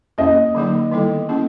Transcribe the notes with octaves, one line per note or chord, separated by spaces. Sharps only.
A#3 C#4 E4 G#4 D#5
D3 F#3 A#3 D#4 G#4
D#3 G3 B3 E4 A4
A#3 C#4 E4 G#4